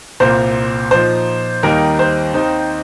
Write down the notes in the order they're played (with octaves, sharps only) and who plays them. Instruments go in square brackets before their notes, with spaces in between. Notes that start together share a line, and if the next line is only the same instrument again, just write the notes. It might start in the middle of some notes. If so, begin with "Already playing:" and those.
[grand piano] C2 A#2 A#3 C5
A#2 F3 D#4 C5
D#2 D#3 G3 A#3 D#4 A#4
C5
D#2 D#3 C4 D#4